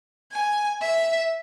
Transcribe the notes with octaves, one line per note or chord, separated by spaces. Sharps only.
G#5
E5